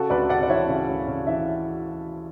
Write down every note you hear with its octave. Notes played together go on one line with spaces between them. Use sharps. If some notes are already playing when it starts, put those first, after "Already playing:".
Already playing: C#3 F#4 A4
D2 B4 D5
C#3 D5 F#5
D5
E3 C#5 E5
C#3
D2
C#3
E3 E5